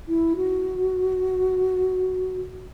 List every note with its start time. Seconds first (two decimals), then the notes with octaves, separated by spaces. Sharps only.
0.08 E4
0.36 F#4